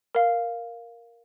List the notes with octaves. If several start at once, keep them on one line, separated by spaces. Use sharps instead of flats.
A#4 F5